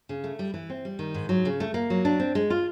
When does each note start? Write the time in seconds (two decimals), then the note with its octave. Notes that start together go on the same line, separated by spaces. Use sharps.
0.09 C#3
0.24 A3
0.39 G3
0.54 E3
0.70 C4
0.85 G3
0.99 D#3
1.14 G#2
1.29 F#3
1.45 C#3
1.60 A3
1.74 A#3
1.90 F#3
2.05 D4
2.20 C4
2.35 G#3
2.50 F4